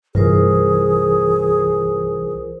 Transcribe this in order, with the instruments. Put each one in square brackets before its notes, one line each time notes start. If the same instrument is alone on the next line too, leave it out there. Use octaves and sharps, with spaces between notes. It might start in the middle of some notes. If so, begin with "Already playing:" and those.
[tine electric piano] C2 E3 [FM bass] G2 [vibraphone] F4 A#4 C5 [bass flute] G#4